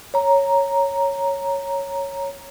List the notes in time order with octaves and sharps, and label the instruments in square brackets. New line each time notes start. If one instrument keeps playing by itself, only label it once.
[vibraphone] C#5 A#5